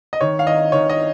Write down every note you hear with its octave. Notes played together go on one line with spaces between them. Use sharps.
D#5
D#3 C#5
F5
D#3 D#5
D#3 C#5
D#5